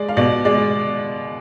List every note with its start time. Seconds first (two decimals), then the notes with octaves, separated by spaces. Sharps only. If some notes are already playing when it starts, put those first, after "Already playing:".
Already playing: G#3 D5
0.09 F5
0.17 B2 D5
0.45 G#3 D5